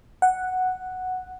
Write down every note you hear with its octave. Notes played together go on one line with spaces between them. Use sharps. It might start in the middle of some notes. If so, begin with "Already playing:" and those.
F#5